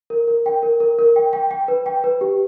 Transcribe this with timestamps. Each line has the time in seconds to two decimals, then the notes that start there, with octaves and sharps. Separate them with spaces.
0.10 A#4
0.28 A#4
0.46 G5
0.63 A#4
0.80 A#4
0.99 A#4
1.16 G5
1.33 G5
1.51 G5
1.68 B4
1.86 G5
2.04 B4
2.21 G4